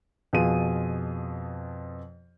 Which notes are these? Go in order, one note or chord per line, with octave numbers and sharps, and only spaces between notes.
F2 B2 F4 G#4 D#7